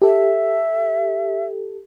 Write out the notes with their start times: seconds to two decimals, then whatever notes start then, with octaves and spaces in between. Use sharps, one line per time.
0.02 G4 A4 E5